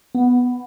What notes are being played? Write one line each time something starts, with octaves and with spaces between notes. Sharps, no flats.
B3